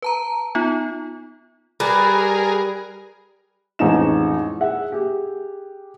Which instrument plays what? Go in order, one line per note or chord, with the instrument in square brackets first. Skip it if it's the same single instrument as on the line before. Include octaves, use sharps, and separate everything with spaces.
[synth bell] B4 A5 A#5
B3 D#4 F4
[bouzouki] G3 [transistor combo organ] G#4 A#4 [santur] B4
[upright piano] A1 F2 G#3 D#4 E7
G#4 E5 F#5
G4 G#4